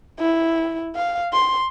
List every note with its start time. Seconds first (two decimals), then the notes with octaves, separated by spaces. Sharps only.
0.20 E4
0.96 F5
1.33 C6